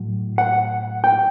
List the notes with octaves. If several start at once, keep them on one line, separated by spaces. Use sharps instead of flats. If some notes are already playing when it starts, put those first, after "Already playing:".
Already playing: A2 F#3
F#5
G5